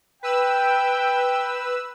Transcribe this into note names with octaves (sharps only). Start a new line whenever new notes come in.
B4 G5 E6